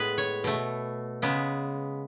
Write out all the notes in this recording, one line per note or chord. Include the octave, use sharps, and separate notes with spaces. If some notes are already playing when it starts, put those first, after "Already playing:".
Already playing: A2 G#3 B3 G#4 B4
C#5
B2 A3
C#3 G#3 B3